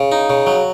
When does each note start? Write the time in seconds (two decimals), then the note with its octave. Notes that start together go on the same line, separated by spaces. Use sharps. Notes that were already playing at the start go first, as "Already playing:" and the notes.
Already playing: C#3
0.12 D#4
0.30 C#3
0.47 F#3